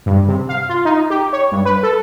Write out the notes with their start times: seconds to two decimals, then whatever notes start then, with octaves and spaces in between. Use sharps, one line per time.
0.06 G2
0.28 C3
0.49 F5
0.69 F4
0.85 D#4
1.10 G4
1.33 C#5
1.52 G2
1.65 B4
1.83 A4